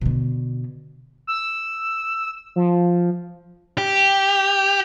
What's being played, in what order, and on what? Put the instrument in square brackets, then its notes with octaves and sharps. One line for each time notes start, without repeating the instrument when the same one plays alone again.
[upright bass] B2 D3
[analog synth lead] E6
F3
[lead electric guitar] G4